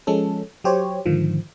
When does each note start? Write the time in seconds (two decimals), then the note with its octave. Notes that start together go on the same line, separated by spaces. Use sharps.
0.07 F3 G#3 C#4 A4
0.64 F#3 G4 C5 C#5
1.06 G#2 D3 D#3 F3